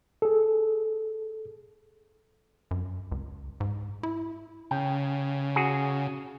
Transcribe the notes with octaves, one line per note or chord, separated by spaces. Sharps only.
G#4 A4
F#2
C#2
G#2
E4
C#3 G5
F#4 G#4